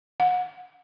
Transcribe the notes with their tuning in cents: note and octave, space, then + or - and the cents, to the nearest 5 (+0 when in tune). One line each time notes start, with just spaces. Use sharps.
F#5 -30